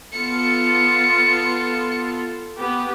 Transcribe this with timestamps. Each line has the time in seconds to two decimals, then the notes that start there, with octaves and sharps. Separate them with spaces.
0.13 B3 F4 A4 C#7
2.58 B3 G4